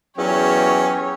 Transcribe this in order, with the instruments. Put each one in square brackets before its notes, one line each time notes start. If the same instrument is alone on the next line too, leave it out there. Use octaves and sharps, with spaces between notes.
[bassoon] E2 [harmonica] F#3 C#4 [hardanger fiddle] G4 [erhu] C#5